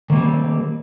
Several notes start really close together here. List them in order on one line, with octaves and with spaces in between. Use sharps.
D#3 A#3 G3 C4